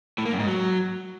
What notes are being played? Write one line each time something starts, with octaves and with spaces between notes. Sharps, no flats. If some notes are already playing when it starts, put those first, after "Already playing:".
A2
A#3
F#2
G#2
F#3